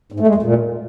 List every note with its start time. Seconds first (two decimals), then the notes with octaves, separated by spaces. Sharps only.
0.12 G#2
0.20 A3
0.27 G#3
0.35 F2
0.42 A#2